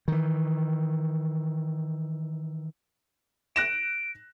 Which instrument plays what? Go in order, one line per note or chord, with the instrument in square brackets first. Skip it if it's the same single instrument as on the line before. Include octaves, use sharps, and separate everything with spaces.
[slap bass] D#3 E3
[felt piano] F#6 A#6 E7 [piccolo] D7